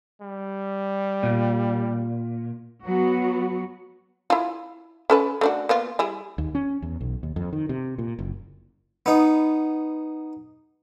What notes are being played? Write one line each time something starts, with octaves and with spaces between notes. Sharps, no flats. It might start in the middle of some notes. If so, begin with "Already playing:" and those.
G3
A#2
F#3 B3 F#4
E4 F4
C#4 A4 B4
A3 D4 F#4
A#3 B3 F4
G3 E4 G#4
D#2
C#4
E2
B1
D#2
F2
D#3
C3
A#2
F#1
B3 D#4